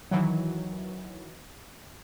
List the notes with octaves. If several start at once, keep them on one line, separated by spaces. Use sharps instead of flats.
D#3 E3 F#3